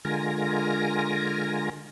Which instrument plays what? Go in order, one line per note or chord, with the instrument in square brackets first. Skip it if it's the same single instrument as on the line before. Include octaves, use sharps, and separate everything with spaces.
[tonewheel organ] D3 G#3 F4 A#4 G#5 A#6